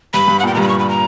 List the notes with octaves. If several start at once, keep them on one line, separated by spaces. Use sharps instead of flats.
G2 B5
G2
F#5
A#2 G5
A#5
G2 B5
C#6
B5
A#5